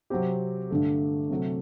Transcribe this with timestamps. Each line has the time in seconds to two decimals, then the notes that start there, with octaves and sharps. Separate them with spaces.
0.10 C3 F#3 C4 G4
0.70 G2 D3 A3
1.30 C3 F#3 A3